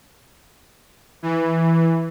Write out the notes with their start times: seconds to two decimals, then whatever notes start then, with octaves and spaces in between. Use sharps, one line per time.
1.22 E3